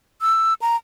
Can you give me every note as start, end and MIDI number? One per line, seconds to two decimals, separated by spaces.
0.21 0.54 88
0.62 0.76 82